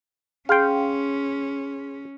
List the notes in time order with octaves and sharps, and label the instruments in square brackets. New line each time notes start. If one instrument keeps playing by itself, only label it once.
[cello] C#4 [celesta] G#4 C6 [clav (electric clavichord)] F5 G5